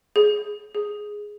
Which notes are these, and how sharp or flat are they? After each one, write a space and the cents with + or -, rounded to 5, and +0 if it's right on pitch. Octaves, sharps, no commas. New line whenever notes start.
G#4 +10
G#4 +0